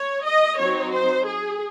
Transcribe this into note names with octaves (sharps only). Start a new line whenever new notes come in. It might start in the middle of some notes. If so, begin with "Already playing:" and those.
Already playing: C#5
D#5
F#3 C4 D#4 C#5
C5
G#4